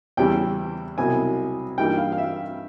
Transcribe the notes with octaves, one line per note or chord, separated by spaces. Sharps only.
E2 C#3 E3 G3 G5
C2 B2 F#3 G#5
G2 E3 G3 A#3 D#4 G5
F5
F5
E5